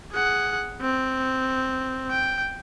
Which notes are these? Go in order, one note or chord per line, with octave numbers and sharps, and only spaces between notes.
G#4 F#5
C4
G5